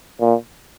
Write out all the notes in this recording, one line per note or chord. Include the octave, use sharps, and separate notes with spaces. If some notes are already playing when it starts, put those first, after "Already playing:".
A#2